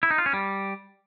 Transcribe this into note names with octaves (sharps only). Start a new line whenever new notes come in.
E4
D#4
F4
C#4
G3